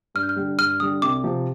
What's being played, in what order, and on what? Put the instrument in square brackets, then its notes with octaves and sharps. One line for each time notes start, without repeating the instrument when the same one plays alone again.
[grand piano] G2 [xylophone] F6
[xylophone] G6
F6
[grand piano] D3 G3
[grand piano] G2 [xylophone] F6
[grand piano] D3 G3 [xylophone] D#6
[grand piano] C2 [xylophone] D6
[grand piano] C3 F3